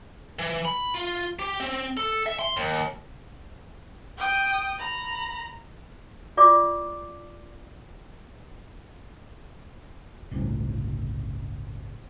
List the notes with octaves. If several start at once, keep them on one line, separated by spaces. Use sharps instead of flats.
E3
B5
F4
G4
C4
A4
E5
C6
D#2
G5 D#6
A#5 B5
F4 D5 E5 D6
G1 C#2 A2 C3